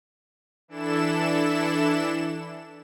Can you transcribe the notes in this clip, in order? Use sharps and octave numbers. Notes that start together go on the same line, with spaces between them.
E3 D4 E4 A4 E7